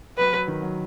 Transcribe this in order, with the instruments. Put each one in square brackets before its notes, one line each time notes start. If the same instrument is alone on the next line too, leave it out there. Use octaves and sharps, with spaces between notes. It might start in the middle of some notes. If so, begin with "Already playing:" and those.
[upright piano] F#3 [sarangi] B4
[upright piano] F#3
D#3
F#3